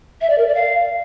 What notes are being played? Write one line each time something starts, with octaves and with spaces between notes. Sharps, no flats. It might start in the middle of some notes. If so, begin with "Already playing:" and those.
E5
D5
A#4
D5
F5